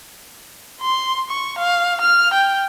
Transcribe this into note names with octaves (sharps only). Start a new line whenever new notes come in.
C6
C#6
F5
F6
G5